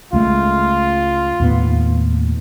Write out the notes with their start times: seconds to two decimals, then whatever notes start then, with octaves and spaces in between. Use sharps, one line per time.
0.13 C#2 G#3 A3 F4
1.40 D#2 A2 B3